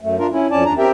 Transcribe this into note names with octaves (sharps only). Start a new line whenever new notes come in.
F#2 A3
D4 F4 A#4
C#4 E4
F2 C#4 D5 A5
D#2 D4 A#5
C4 G4 A#4 E5 G5